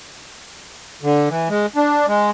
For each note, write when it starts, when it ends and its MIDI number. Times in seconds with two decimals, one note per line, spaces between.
1.03 1.29 50
1.29 1.48 52
1.49 1.66 56
1.76 2.06 62
2.07 2.31 56